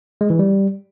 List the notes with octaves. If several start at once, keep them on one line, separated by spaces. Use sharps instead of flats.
G#3
E3
G3